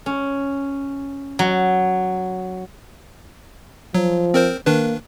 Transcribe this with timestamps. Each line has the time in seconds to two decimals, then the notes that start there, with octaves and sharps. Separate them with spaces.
0.06 C#4
1.39 F#3
3.95 F3 F#3
4.34 C4 A#4 C5
4.66 D#3 A#3 D4 B4